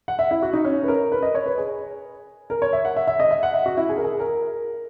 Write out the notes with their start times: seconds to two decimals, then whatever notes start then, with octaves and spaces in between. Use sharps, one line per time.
0.08 F#5
0.19 E5
0.31 E4
0.42 F#4
0.53 D#4
0.65 C#4
0.83 B4
0.88 A#4
1.12 B4
1.23 D#5
1.35 C#5
1.46 B4
1.58 G#4
2.50 A#4
2.62 C#5
2.73 E5
2.85 F#5
2.96 E5
3.07 E5
3.20 D#5
3.31 E5
3.43 F#5
3.54 E5
3.66 F#4
3.77 E4
3.89 G#4
3.97 A#4
4.04 G#4
4.20 A#4